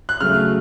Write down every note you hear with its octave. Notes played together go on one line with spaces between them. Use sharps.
F#6
C#3 F#3 A3 F6